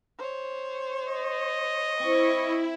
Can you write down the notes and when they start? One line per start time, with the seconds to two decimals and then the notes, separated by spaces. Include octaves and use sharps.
0.18 C5 C#5
1.08 D#5
2.00 C4 E4 C#6